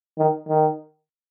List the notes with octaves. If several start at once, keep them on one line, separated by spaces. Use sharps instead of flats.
D#3
D#3